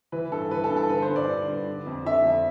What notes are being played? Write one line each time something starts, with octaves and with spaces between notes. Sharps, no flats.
E3 B4
G2 A4
E3 B4
A4
G2
A4
D3 B4
C5
G2
D5
D3
G2
D3
F2
D3 E5
F2